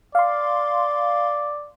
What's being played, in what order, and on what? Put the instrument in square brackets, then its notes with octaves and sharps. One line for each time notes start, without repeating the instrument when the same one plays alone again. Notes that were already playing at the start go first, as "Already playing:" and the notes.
[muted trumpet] D5 [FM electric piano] F5 C6